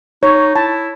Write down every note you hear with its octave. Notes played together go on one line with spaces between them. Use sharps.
D#4 C#5
E4 A5